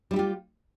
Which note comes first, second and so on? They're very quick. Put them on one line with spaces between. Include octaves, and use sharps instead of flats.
G3 E4 G4 F4